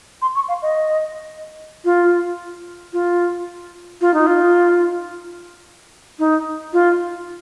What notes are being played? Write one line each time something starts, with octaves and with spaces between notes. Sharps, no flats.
C6
C#6
F5
D#5
F4
F4
F4
D#4
F4
D#4
F4